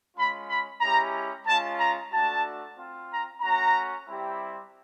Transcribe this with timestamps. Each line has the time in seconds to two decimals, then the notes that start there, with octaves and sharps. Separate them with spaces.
0.15 G#3 C#4 F4 B5
0.47 B5
0.80 G#3 C#4 E4 G4 A#5
1.46 G#3 C#4 F4 A5
1.78 A#5
2.11 A3 D4 F#4 A5
2.76 C4 F4
3.09 A#5
3.41 A3 C#4 F#4 A#5
4.07 G3 C4 E4 G4